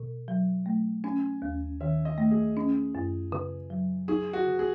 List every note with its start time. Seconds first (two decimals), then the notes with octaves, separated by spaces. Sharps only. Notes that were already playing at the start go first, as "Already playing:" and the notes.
Already playing: B2
0.28 F#3
0.66 A3
1.04 C#4 G#5
1.42 D#2
1.80 D#3 E5
2.05 D#5
2.18 A3
2.31 G#4
2.57 C#4
2.95 F#2
3.32 C#3
3.70 F#3
4.08 D#4 G#4
4.33 F#4
4.47 C#3
4.59 G#4